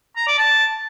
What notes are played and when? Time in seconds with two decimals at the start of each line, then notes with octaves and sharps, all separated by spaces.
0.17 A#5
0.28 D5
0.39 A5